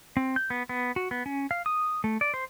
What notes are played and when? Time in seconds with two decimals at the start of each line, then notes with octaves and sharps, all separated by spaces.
0.17 C4
0.36 G6
0.50 B3
0.69 B3
0.96 F#4
1.11 B3
1.26 C#4
1.51 F5
1.66 D#6
2.04 A3
2.21 D5
2.34 C5